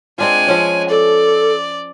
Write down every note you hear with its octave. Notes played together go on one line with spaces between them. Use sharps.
G#3 C4 D4 F4 G#5
F3 C#4 C#5
A4 D5